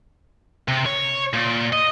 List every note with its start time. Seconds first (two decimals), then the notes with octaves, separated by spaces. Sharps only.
0.68 C3
0.86 C#5
1.34 A#2
1.73 D#5